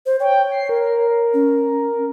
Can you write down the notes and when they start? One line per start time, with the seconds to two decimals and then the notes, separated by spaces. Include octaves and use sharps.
0.06 C5
0.20 C#5 G5
0.52 C7
0.69 A#4
1.34 C#4